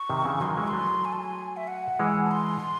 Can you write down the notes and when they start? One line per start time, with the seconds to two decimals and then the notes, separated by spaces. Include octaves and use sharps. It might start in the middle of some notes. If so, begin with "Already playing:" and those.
Already playing: C#6
0.10 C3 D#3
0.25 C#3 E3
0.41 D#3 F#3 C6
0.55 E3 G#3 C#6
0.68 C6
0.73 F#3 A3
1.05 G#5
1.12 A5
1.20 G#5
1.57 E5
1.68 F#5
1.99 E3 G#3
2.24 A5
2.32 C6